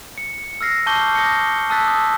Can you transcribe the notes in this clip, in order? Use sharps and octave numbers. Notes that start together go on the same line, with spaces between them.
C#7
E6 F6 A#6 C7
A5 C#6 D6 G6 G7
D#6 A#6 C#7
A5 D#6 E6 F#6 A6 B6
D#6 E6